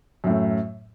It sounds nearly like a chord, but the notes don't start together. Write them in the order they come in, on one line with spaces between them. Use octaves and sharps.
F#2 A2 A3